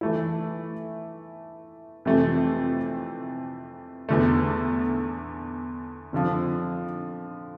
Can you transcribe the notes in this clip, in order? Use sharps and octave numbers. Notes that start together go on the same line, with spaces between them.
E3 A3 E4
F2 C3 E3 A3 C4
E2 D3 A3
F2 D3 F3